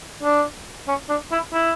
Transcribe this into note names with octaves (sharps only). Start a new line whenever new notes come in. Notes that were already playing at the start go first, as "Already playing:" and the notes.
D4
C#4
D4
E4
E4